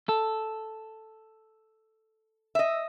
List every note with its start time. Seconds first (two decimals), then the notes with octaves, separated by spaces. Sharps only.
0.09 A4
2.55 D#5 E5